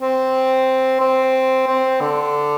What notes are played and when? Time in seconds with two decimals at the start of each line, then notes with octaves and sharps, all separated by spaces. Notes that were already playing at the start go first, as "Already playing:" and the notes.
0.01 C4
1.01 C4
1.68 C4
2.01 D3